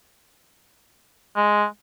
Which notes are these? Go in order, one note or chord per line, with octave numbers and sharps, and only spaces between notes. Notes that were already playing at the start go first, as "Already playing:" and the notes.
G#3